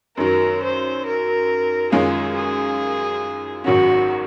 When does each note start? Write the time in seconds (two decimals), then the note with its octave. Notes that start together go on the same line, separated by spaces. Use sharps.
0.17 F#2 D#3 F#3 A#4
0.62 C5
1.05 A#4
1.92 F#2 D#3 G#3 C#4 F4 G#4
2.34 G#4
3.64 G#1 G#2 D#3 F#3 C#4 F#4